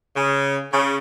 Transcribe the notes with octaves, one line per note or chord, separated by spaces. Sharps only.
C#3
C#3